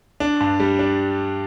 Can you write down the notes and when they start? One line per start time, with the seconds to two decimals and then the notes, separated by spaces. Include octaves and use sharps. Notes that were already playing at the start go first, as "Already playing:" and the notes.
0.20 D4
0.41 G2
0.60 G3
0.79 D4